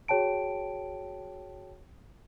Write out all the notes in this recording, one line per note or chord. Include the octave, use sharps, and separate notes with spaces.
F#4 G#4 C#5 G5 A5 D7